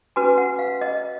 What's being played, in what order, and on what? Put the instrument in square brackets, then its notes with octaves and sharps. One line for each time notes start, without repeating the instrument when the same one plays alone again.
[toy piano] C#4 F#4 B4 G#5
F#5
F5
D#5